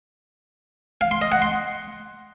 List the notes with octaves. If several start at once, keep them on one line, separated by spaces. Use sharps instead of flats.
F5
C6
D#5
F#5
C6